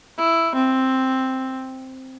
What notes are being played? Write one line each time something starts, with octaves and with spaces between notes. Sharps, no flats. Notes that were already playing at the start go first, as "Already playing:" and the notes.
E4
C4